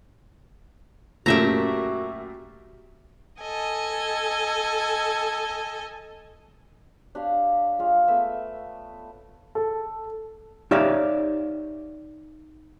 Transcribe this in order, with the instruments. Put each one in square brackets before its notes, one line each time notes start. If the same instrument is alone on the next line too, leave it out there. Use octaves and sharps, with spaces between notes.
[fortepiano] F#2 A#2 A3 [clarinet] F#4 [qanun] G4 E5 A#5
[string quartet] A4 D#5 G#5
[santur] D4 G4 C#5 F5
G#3 F4 C#5
A3 B3 E5 E6
[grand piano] A4
[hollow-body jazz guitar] D#4 G4 C#5 D5 E5 F5